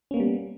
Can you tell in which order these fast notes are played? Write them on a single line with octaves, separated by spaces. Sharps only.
C#4 A#3 B3 G3